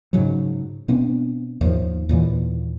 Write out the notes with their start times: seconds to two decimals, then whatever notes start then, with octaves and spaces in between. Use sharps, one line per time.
0.13 G#2 C#3 F#3
0.88 B2 B3 C4 D4
1.61 D#2 G#2 F3
2.09 D#2 A#2 E3